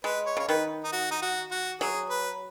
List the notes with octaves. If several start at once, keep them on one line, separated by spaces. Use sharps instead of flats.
G#3 B4
C#5
C#3 C#5
D#3 B4
D#4
F#4
D#4
F#4
F#4
F#3 G#4
B4